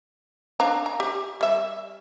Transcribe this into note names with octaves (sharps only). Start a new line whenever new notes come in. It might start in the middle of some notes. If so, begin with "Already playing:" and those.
D4 F5 A#5
A#5
G4
G3 E5